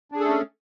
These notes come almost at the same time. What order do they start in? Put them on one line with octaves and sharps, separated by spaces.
D4 G#4 A4 A3 C#4